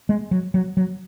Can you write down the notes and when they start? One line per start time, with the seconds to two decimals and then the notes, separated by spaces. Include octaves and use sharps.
0.09 G#3
0.31 F#3
0.54 F#3
0.77 F#3